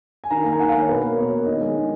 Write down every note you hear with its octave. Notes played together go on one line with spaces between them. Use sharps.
G#5
D#3 A#5
A#3 A#5
G#5
D#3 F#5
F5
A#3 C#5
B2 B4
A#3
B2 C#5
A#3
D#3 D#5
G#3
D#3